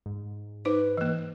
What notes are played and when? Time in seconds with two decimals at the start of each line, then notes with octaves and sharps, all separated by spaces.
0.06 G#2
0.65 D#4 B4 C5
0.97 E3 A#3